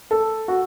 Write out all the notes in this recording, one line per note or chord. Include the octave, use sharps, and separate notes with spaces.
A4
F#4